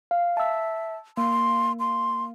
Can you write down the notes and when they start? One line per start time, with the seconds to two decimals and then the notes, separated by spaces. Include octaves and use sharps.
0.11 F5
0.37 E5 A5 E6
1.17 A#3 C6
1.80 C6